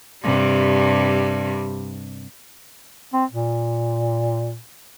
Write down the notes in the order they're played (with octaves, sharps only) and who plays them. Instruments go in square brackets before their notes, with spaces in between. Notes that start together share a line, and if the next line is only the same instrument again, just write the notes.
[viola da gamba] G2 C3 G3
[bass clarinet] C4
A#2